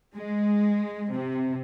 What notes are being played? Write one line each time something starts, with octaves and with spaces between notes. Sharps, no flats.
G#3
C3